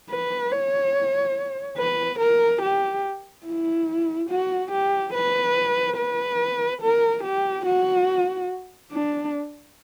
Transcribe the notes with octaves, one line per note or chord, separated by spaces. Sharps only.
B4
C#5
B4
A#4
G4
E4
F#4
G4
B4
B4
A#4
G4
F#4
D4